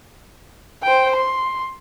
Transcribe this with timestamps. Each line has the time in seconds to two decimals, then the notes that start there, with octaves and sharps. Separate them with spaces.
0.83 C5 G5
1.16 C6